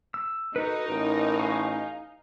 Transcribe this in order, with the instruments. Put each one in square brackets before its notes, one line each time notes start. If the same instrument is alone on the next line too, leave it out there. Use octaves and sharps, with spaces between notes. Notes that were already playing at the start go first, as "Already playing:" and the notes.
[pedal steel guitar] E6
[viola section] D#4 [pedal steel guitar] F#4 A4 B4
[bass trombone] A1 [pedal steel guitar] A#4
[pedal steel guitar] F5 G#5 C#6